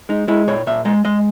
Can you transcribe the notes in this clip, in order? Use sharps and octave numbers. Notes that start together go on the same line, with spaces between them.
G#3 D#4
G#3 E4
A#2 C#5
A#2 E5
G#3 D#5
G#3 D#5